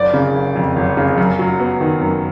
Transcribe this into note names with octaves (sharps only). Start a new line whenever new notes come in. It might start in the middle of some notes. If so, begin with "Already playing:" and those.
Already playing: F#1 D5
C#3
F#1
F2
F#1
C#3
F#2
F#3
B3
D#3
F#2